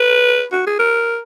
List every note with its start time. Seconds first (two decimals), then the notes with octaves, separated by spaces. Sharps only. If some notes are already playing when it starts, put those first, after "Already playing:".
Already playing: B4
0.52 F#4
0.67 G#4
0.79 A#4